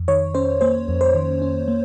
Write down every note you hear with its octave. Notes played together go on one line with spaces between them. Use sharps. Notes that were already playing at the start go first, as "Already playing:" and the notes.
Already playing: F2
D#3 C#5
C#4 C5
A#3 C5
F2
C5
D#3
C#4
A#3